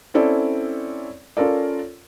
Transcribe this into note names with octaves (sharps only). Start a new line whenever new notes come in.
C4 C#4 E4 A4 D5
C#4 F4 A4 A#4 D5